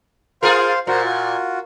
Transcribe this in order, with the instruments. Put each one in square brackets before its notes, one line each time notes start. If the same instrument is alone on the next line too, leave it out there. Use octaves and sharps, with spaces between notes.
[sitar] F4 G#4 A#4 [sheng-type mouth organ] C5 F5 C6
[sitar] A#2 [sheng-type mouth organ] F#4 A#4 C5
[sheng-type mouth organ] F4 F#4